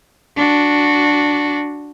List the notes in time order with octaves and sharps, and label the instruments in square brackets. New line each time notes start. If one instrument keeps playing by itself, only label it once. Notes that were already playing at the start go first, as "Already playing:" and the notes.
[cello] D4 F#4